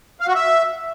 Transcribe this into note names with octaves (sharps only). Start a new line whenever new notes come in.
F5
F#4
E5